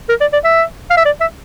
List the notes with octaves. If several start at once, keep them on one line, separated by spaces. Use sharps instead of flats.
A#4
D5
D5
E5
F5
E5
D5
E5